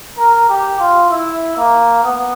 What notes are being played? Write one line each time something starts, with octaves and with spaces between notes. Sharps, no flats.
A#4
G4
F4
E4
A#3
B3